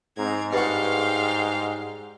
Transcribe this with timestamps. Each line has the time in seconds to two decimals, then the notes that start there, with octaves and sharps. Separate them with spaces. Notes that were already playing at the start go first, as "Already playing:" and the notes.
0.18 G#2 C4 A#5 G#6
0.53 G2 F#4 F5 G5 F6